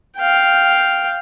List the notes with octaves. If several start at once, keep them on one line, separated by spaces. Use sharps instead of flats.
F5 G5